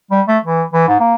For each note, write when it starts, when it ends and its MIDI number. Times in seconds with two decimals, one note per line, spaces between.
0.11 0.21 55
0.28 0.38 57
0.45 0.63 52
0.73 0.86 52
0.88 0.96 44
1.00 1.15 58